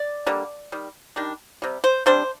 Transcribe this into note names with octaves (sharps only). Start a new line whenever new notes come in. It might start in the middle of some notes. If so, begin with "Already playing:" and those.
Already playing: D5
D3 G3 A#3
D#3 G3
D#3 G3 D4
C3 G3
C5
C3 G3 D4 C5